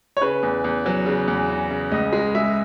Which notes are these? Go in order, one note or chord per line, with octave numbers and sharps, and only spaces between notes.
C#5
C#3 B4
E2
E2
F#3
C#3
E2
C#3
C#3
C#2 D#5
G#3
G#3 E5